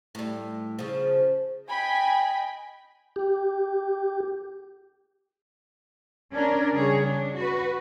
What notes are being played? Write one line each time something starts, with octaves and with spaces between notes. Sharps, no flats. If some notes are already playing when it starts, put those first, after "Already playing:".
A2 G3
C#3 F3
D#5 G5 G#5 B5
G4
C#4 D4 A#4 D5
C#3 G3 G#4 C#5
D4
F#4 B4